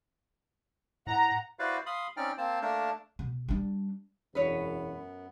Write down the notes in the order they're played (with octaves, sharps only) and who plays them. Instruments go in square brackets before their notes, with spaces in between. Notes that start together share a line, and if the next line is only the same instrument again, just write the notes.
[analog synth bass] A2 [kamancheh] F#5 [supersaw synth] A#5
[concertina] E4 F#4 B4 C5 D5 F5
F5 B5 C6 D#6
C4 C#4 D#4 D5 G5 F6
A#3 C4 C5 A5
A3 A#3 D4 A#4 A5
[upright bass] B2
G3 D4
[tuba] E1 [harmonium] F#2 B3 [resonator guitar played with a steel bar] B4 C#5